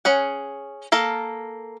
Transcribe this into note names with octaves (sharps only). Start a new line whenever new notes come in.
C#4 G#4 F#5
A#3 A4 F5